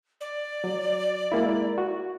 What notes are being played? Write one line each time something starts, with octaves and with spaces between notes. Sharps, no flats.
D5
F#3
G#3 A#3 E4
F#4